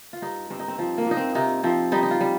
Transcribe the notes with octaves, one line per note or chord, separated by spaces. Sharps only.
F4
G2 D#4
G2 C4
D#4
C4
F3 C4
A#3
A#2 D#4
C4
C3 D#4
F3 C4
G3 D#4
D#4
F4
G3